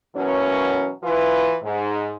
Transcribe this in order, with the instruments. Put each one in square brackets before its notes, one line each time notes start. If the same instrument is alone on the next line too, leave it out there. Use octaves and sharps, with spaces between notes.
[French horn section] B2 E3 F#3 A#3 C#4
E3 E4 F4 B4
G#2